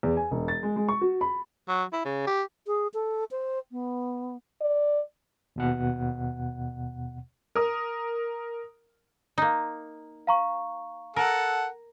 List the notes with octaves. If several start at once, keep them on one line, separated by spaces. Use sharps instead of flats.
E2
G#5
E1
A6
G#3
G#3
C#6
F#4
B5
F#3
E4
C#3
G4
G#4
A4
C5
B3
D5
D#2 B2 F#5
A#4 D#6
A#3 D#4
F5 A#5 C#6
A4 A#4 F#5